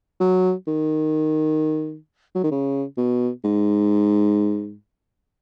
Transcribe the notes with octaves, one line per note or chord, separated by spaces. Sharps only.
F#3
D#3
F#3
D#3
C#3
B2
G#2